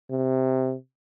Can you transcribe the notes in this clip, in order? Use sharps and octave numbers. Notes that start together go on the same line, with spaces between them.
C3